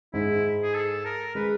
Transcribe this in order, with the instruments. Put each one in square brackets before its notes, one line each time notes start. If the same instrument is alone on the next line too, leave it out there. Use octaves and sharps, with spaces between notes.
[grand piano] G#2 G#3 [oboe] E4
[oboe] G#4
A4
A#4
[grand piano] G#3 [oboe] B4